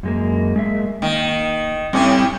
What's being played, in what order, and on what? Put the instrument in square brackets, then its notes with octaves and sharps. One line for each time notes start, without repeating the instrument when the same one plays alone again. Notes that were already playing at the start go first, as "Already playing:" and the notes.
[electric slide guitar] F#2 G#3 A#3
G#3 A#3 E5
[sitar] D#3 [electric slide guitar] A#3
[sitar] A2 C#4 [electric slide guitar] G3 C4